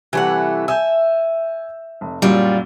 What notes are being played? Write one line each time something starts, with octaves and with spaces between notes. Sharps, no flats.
C3 E3 G3 A3 F#5
E5 G#5 E6 G6
F1
F#2 A#2 F#3 G3 F4